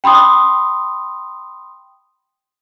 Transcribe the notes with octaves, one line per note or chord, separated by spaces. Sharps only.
G5 B5 C6 D#6